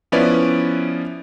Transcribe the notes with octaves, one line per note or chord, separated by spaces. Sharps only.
F3 B3 C#4 E4 B4 D5